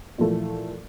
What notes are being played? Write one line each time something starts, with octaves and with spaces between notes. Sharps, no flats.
A#2 E3 F3 A3